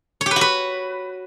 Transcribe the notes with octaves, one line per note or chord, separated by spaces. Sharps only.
C#5
G4
B4
F#4
B4